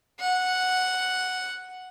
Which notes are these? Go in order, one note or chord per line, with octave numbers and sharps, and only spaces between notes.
F#5